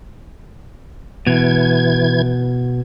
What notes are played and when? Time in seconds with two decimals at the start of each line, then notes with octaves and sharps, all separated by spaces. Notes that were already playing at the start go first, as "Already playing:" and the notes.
1.27 B2 E3 G#6